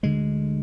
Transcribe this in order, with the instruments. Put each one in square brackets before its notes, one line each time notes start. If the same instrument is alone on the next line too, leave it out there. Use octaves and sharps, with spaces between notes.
[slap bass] D2 D3 G#3